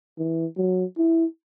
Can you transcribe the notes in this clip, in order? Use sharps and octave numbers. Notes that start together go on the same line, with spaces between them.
E3
F#3
E4